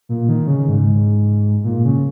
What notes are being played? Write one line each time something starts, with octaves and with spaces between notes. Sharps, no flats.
A#2
D#3
C#3
G#2
A#2
C#3